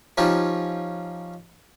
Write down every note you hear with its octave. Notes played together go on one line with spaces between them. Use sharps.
F3 C#4 D#4 F4 G4